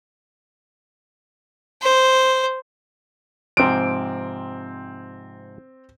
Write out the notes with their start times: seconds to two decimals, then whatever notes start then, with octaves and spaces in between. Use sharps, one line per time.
1.82 C5
3.57 G#2 C3 F3 C4 D7